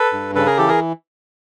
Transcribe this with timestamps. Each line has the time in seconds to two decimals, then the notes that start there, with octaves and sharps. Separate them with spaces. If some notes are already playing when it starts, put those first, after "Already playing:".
Already playing: A4 B4
0.13 G2
0.35 C#3 A4 B4
0.46 G#4 A#4
0.57 E3 G4 A4
0.68 G#4 A#4